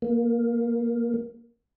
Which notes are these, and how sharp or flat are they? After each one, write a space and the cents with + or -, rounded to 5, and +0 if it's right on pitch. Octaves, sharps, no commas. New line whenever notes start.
A#3 +10